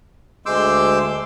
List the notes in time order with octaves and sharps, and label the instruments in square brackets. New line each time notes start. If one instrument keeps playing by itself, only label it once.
[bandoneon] D2 G#3 C6 D6 E6 G6